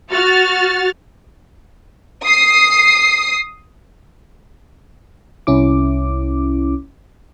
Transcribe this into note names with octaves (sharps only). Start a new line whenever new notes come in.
F#4 F6 A6
D#6 C7
C2 C#4 E4 D6